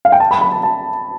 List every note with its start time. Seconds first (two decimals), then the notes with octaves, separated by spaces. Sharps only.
0.05 F5
0.12 G5
0.20 A5
0.31 B5
0.41 B5
0.52 A5
0.63 A5